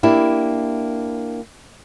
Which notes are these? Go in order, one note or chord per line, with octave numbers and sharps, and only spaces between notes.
A#3 D4 E4 G4